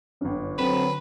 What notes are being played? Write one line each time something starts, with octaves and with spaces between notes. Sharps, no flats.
G1 F#2
D3 F#3 C4 B4 E7